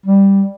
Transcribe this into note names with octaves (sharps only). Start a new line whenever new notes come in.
G3